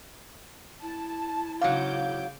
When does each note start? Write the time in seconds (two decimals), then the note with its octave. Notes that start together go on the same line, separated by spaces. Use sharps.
0.82 E4 A5
1.61 G#2 C#3 F#3 F5 D6 G6